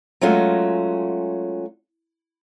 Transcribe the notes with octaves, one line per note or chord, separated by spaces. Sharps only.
F#3 G#3 A3 C#4 F4 F#4